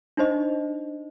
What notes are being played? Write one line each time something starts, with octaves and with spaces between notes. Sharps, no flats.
D4 D#4 C5 D#5